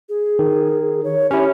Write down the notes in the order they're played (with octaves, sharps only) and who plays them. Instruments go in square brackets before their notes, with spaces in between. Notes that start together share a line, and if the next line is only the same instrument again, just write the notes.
[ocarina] G#4
[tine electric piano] D#3
[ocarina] C#5
[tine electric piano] C#4 E4 [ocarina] G4